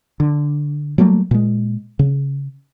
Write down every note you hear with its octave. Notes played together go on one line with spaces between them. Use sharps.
D3
F#3 G3 A3 A#3
A#2 G#3
C#3